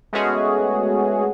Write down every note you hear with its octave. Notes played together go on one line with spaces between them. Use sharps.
G#3 A3 B3 C#4 F#4 G#4